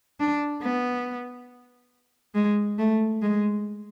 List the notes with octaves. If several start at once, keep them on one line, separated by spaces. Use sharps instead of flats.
D4
B3
G#3
A3
G#3